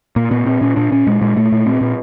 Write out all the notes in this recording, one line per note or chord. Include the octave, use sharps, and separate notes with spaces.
A#2 A#3
A#2 B3
A#2 C4
A#2 C#4
A#2 D4
A#2 C#4
A#2 G#3
A#2 G#3
A#2 A3
A#2
A#2 C4
A#2